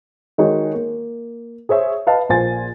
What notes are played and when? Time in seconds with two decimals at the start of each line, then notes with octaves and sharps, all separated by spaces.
0.38 D#3 G#3 D#4 F#4 C#5
0.74 A#3
1.69 G#4 C5 C#5 E5
2.07 B4 D#5 F5 A5
2.29 A#1 A#3 F4 C5 G#5 A6